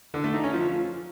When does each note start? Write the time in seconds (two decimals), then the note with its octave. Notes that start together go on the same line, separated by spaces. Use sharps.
0.14 D3
0.24 A3
0.34 D#4
0.44 C#4
0.54 F3